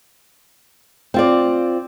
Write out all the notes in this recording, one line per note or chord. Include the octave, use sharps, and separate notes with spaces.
C4 F4 D5